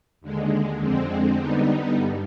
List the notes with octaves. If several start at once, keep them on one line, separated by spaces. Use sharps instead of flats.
D#2 D3 G#3
F2 D3 G#3 C4
D3 G3 B3 D#4
G2